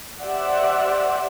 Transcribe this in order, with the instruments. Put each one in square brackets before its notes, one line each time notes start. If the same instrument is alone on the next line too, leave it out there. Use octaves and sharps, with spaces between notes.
[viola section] G4 C5 D5 E5 F#5